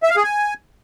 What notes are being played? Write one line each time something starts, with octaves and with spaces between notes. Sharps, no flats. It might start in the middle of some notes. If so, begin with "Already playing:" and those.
E5
F5
G#4
G#5